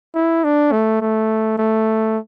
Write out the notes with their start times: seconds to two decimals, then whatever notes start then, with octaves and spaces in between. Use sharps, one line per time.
0.15 E4
0.44 D4
0.72 A3
1.01 A3
1.58 A3